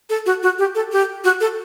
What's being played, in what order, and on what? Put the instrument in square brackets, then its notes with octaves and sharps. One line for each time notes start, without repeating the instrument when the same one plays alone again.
[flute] A4
F#4
F#4
G4
A4
G4
F#4
A4